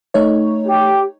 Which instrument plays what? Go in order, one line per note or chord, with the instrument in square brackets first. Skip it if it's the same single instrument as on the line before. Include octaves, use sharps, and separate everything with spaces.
[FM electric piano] A3 D#4 C#5
[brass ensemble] G4